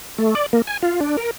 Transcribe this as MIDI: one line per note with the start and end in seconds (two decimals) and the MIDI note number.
0.18 0.34 57
0.35 0.46 74
0.53 0.62 58
0.67 0.77 80
0.83 1.00 65
1.01 1.17 62
1.17 1.31 70